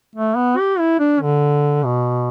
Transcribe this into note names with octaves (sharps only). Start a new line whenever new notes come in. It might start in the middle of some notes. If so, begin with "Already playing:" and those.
A3
B3
G4
E4
D4
D3
B2